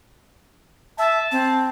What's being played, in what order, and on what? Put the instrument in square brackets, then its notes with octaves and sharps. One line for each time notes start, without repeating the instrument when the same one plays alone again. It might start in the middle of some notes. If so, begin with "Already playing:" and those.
[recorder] E5 [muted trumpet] A5
[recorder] C4